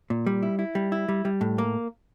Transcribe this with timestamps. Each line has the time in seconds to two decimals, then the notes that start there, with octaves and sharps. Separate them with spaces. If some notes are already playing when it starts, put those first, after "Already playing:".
0.10 A#2
0.27 G3
0.43 E4
0.59 E4
0.75 G3
0.92 E4
1.08 G3
1.25 G3
1.41 A2
1.58 A#3